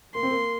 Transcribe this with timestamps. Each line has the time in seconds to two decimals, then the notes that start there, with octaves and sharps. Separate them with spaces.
0.14 A#3 C6
0.23 C4
0.31 A#3